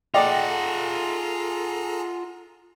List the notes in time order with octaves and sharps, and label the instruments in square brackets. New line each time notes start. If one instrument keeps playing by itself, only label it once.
[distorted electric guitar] F4 F#5 [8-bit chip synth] G#4 A4 A#5 [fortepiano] D5 D#5 [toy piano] G5